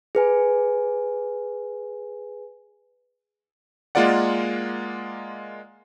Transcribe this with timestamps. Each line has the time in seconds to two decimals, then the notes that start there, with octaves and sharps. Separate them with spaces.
0.15 G#4 B4 G#5
3.95 G#3 A#3 F4 A#4 D5 F#5